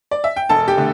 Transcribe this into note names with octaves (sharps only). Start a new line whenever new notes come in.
D5
E5
G5
E1 A4 A5
G4 G5
D3 A3